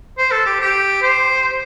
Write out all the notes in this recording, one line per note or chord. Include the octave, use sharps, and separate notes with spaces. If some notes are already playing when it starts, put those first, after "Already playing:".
C5
A4
G4
G4
C5